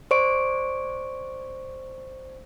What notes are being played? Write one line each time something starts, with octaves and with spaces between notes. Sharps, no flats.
C5 D5 C#6 D7